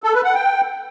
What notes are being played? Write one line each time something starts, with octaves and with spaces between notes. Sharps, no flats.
A4
B4
F#5
G5